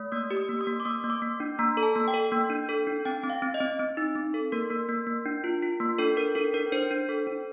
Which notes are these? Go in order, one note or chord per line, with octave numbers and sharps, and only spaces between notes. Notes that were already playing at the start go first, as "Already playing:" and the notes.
Already playing: A3
A#3 D#6
G4
D#6
A#3
D#6
A#3
D6
A#3 D#6
A#3
D6
A#3
D4
A#3 A#5
A4
A5
A#3
G5
A4
A#3
D4
A4
D4
C4 G5
C4
F5
C4
D#5
C4
C4
D#4
C4
A4
A#3 A#4
A#3
A#3
A#3
D4
F4
F4
A#3
D4 A4
D4 A#4
D4 A4
D4 A#4
D4 C5
D4
A4
D4